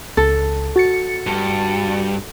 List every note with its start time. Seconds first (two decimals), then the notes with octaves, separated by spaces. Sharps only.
0.17 C#2 A4
0.76 F#4 A6 C#7
1.27 G2